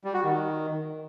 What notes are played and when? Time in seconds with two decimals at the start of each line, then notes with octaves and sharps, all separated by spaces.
0.04 G3
0.14 F#4
0.23 D#3